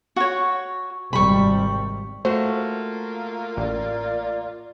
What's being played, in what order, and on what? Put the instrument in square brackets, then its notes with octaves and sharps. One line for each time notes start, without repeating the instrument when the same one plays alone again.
[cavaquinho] F#4 C#5
[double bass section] G#1 C3 G3 [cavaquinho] B5 C#6
[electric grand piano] A3 F#4 [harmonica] A#3 F4 [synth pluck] C5
[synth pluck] A1 [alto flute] D5